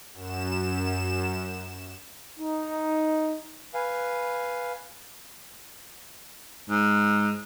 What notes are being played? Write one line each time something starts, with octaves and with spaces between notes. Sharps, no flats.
F#2 E7
D#4
B4 F5 G#5
G#2